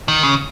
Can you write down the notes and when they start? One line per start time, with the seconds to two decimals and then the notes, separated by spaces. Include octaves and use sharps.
0.08 D#3
0.23 C#3